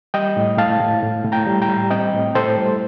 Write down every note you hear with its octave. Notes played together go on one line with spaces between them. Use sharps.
G3 D#5 G5
A2
A2 F5 A5
A2
A2
A2
G5 A#5
G3
G5 A#5
G3
C4 D#5 G5
A2
A2 A4 C5
G3